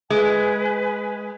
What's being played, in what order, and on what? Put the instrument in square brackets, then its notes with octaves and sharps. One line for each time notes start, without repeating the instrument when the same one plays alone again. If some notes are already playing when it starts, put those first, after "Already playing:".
[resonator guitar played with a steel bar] G#3 [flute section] B4 G#5